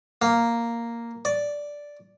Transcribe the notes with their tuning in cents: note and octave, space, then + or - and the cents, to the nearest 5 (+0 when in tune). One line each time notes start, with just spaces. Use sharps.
A#3 +0
D5 -5